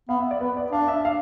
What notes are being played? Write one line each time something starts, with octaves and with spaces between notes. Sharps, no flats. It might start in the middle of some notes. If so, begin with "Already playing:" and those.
B3 F5
E5
D5
B3 B4
D5
D4 F5
E5
F5